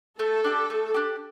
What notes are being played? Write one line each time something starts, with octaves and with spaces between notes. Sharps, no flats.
A3 A4
D4 G4
A3
D4 G4